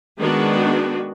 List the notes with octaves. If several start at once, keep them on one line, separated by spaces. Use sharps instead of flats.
D#3 G#3 B3 D4 F#4